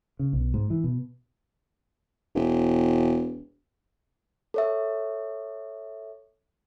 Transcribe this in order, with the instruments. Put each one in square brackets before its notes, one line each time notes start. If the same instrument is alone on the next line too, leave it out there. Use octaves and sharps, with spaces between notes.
[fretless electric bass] C#3
B1
G#2
E3
B2
[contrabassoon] E1
[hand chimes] A4 C#5 E5